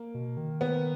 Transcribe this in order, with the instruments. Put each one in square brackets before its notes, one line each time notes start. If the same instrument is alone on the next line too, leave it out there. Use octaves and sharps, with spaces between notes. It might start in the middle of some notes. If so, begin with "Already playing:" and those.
Already playing: [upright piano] A#3
[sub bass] B2
D#3
[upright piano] B3